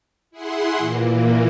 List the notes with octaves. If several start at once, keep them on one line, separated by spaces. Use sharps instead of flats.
E4 G#4 F#5 C6
A#2 E3 A#3